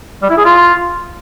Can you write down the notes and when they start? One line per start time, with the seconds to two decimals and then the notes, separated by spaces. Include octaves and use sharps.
0.22 G3
0.30 E4
0.37 G#4
0.45 F4